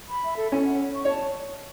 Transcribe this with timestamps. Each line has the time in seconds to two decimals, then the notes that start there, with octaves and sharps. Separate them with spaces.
0.09 B5
0.23 E5
0.37 A4
0.52 C#4 A4
0.66 F#5
0.80 C#5
0.94 C#6
1.05 C#5
1.09 A5